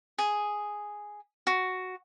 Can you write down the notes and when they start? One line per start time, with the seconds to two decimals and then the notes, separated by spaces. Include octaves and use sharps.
0.18 G#4
1.47 F#4